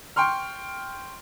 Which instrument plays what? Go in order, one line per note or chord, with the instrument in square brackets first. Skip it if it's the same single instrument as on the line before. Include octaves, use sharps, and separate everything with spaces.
[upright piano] G5 C6 C#6 F6